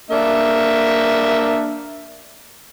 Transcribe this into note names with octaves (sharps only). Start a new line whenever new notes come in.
A#3 D4 E5